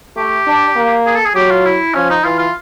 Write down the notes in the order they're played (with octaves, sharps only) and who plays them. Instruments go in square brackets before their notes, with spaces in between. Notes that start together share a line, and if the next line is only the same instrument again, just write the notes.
[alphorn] A3 [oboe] G4
[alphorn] D4
A#3
[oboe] G#4
A4
G#4
[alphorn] F#3 [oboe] G4
[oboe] F4
E4
[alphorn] F3 [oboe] C#4
[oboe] D#4
[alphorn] E3 [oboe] F4
[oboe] F4